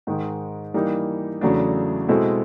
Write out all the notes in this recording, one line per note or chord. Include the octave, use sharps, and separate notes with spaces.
G#2 D#3 G#3
E3 G3 A#3 D#4
E2 C#3 F#3 A3 D4
B2 G#3 C4 E4 A4